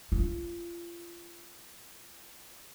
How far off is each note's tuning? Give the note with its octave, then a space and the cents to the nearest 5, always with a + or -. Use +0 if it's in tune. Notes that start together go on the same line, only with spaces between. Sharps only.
F4 -30